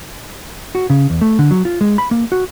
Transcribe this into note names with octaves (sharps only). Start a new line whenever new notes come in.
F#4
C#3
E2
A3
D3
F#3
F4
G#3
B5
A#3
F#4